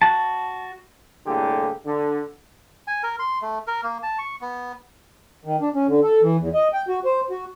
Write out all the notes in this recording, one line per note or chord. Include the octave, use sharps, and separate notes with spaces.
F#4 A5
C2 A2 D3 A#3 G4 G#4
D3
G#5
A#4
C6
A3
A#4
A#3
A5
C#6
B3
D#3
D4
C#4
D3
A4
E3
E2
D#5
G5
F#4
C5
F#4